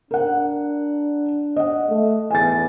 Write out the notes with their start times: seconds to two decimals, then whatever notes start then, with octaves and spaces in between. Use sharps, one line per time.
0.11 D4 A#4 F#5
1.56 D#5 F#5
1.89 A3
2.31 E2 G#5 A6